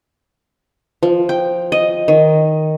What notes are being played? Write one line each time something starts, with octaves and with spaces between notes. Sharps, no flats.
F3
G5
D#5
D#3